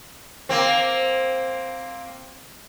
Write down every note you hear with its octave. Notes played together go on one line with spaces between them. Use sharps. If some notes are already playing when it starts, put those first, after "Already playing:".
A#3 C4